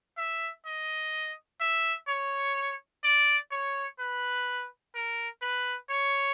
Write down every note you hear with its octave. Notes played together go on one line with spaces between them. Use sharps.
E5
D#5
E5
C#5
D5
C#5
B4
A#4
B4
C#5